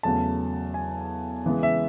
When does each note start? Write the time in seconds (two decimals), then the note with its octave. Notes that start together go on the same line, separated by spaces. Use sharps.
0.03 E2 C#3 F#3 A3 A5
0.74 G#5
1.46 C#3 E3 G#3 B3
1.63 E5